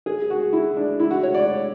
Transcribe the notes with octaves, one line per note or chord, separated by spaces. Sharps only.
G#4
F#4
E4
D4
E4
F#4
C#5
D5